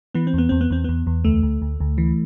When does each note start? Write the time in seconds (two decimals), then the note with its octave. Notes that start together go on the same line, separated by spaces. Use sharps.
0.15 E3 B3
0.27 C4
0.34 E2 B3
0.49 E2 C4
0.61 B3
0.70 E2 C4
0.84 E2 B3
1.07 E2
1.25 D2 A3
1.43 D2
1.62 D2
1.80 D2
1.98 E3